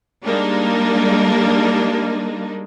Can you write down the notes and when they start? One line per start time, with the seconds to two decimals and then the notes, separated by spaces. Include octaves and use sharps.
0.24 G3 G#3 A#3 D4 D#4